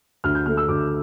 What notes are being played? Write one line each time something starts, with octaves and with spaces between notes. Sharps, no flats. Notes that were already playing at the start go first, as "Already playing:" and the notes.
D2 F6
G6
D3 A3 F6
E6
D2 D6